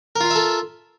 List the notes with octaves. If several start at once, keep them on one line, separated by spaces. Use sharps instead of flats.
F4 A4 A#4 E5 F5